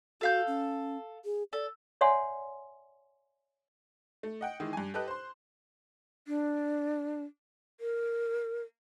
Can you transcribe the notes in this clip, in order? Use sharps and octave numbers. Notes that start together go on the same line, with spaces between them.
F#4 A4 F5 G6
C#4
G#4
A4 D5
C#5 D5 E5 F#5 G#5 C6
A3
D#5 F#5 G5
D#3 E3 G#3
G2 G#5
G4 A4 B4 D#5 F#6
C5 C6
D4
A#4